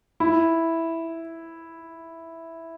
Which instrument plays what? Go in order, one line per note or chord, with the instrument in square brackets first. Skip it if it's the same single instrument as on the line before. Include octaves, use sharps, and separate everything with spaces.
[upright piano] E4